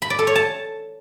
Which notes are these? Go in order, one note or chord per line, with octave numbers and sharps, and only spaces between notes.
B5
D5
A4
C#5
A5